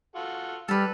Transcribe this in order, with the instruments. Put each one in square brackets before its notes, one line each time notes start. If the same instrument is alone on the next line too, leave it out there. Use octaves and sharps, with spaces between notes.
[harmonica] F4 F#4 A4
[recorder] G3 [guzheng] A4 B4 [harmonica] E6 F6